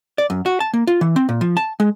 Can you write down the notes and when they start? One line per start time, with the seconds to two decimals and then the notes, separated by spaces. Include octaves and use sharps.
0.18 D5
0.30 F#2
0.46 F#4
0.60 A5
0.74 A#3
0.87 F4
1.01 E3
1.16 C4
1.29 A#2
1.41 F3
1.57 A5
1.80 G#3